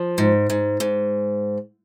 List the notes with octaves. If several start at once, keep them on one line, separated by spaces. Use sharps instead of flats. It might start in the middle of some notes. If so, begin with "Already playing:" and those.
Already playing: F3
G#2
G#2
G#2